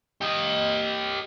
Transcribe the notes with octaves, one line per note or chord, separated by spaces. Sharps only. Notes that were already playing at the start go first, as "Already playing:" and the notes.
G4 D#5